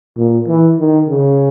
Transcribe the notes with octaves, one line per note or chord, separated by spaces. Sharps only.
A#2
E3
D#3
C#3